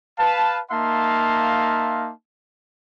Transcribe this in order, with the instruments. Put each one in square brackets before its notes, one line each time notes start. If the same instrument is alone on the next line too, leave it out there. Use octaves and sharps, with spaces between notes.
[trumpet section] B4 F5 A5
A#3 D#4 E5 F5 A5 C6